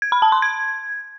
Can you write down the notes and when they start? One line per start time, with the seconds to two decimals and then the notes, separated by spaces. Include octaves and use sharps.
0.02 G#6
0.12 B5
0.22 A5
0.32 C6
0.42 G#6